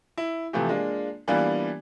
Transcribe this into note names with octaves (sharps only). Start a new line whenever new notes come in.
E4
C3 E3 F3 A3 G4
G#3 A#3 D4 F4
E3 G3 A#3 B3 D4 F4